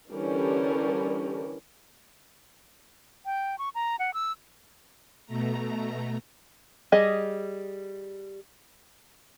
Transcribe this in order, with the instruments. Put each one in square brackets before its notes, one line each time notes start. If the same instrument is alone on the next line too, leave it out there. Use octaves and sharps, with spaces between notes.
[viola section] D3 E3 G3 C#4 A#4
[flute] G5
C#6
A#5
F#5
E6
[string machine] B2 A3 A#5
[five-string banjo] G3 G#4 D#5